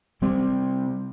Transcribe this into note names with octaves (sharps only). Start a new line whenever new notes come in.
C3 G3 C4